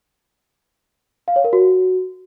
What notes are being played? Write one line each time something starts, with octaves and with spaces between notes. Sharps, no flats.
F5
C#5
A#4
F#4